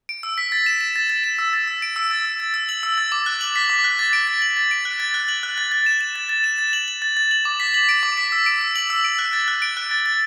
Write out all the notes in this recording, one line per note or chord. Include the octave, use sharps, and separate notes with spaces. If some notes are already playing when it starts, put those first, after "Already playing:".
D7
E6
B6
A6
E7
E7
A6
A6
E7
E6
A6
E6
D7
E6
A6
E6
A6
E6
F#7
E6
A6
D6
F#6
F#7
B6
D6
F#6
A6
D7
A6
F#7
A6
D7
F#6
A6
F#6
F#7
F#6
A6
A6
E7
E7
A6
A6
E7
A6
F#7
F#7
A6
A6
F#7
D6
B6
F#7
D7
D6
B6
E6
D7
E6
F#7
E6
D7
F#6
A6
F#6
D7
F#6
A6
A6